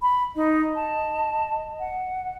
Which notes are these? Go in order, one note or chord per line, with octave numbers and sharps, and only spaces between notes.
B5
D#4 D#5
A5
F#5